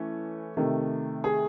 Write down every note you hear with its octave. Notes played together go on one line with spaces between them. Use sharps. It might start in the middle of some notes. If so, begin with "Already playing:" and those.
Already playing: E3 A3 C#4
C3 D#3 A3
G#4